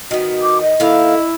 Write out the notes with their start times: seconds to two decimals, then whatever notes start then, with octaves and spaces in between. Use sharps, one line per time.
0.11 D#3 B3 F#4
0.42 D6
0.62 D#5
0.80 D#3 A#3 E4 A4 F5